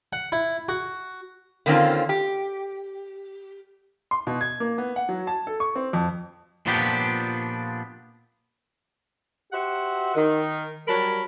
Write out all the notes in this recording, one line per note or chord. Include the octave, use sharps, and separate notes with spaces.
F#5
E4
F#4
D3 D#3 A#3 C4 C#4 F4
G4
C6
B2
G#6
A#3
B3
F#5
F#3
A5
A4
C#6
C4
F2
A#2 F3 B3 D4 G4
F#4 G4 C5 E5 F#5
D#3
F#3 G3 A#4 C#5 A5 B5